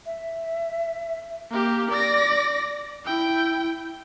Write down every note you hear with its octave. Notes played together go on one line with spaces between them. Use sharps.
E5
A#3 G4
D5 A#6
E4 G5